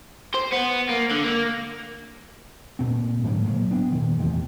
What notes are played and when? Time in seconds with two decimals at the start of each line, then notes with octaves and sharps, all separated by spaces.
0.35 C5
0.53 B3
0.89 A#3
1.11 D3
1.23 A#3
2.79 D2 A#2 C4
3.24 G#2 D3 F#3 A#3
3.44 A#2 F#3 A3 A#3
3.71 B3 D4
3.92 A#2 D#3
4.19 A1 E2 C3